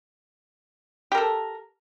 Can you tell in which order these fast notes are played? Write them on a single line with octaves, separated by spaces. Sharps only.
G4 A#4 A4